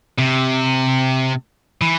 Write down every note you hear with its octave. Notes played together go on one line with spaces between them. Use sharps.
C3
E3